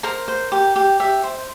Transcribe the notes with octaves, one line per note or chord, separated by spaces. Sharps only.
A#4 C5 A#5
C5
G4
G4
G4 E5
C5